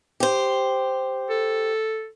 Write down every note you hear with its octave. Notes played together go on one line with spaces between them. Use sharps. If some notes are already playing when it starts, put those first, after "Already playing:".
G4 C5
A4